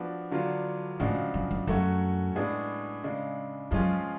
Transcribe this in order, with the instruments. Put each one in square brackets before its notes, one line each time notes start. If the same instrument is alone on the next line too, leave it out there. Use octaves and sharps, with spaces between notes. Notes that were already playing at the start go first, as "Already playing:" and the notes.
Already playing: [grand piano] F3 B3 D4 F#4
D3 F#3 B3 D4 F4
[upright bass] A2 [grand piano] C#3 F3 G#3 D4 F#4
[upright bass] F#2
F#2
[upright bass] F#2 [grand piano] F#3 A3 C#4 F#4
[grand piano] A2 G#3 B3 D4 G#4
C#3 G#3 D4
[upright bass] F#2 [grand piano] F3 G#3 C#4 F4 G#4